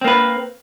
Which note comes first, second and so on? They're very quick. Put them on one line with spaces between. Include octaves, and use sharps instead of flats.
C4 A#3 B4